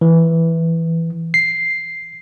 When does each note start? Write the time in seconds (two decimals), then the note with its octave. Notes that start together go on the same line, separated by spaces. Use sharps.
0.01 E3
1.34 C7